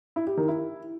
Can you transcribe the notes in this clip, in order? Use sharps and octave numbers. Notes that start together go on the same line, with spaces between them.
E4
G4
D#3
E4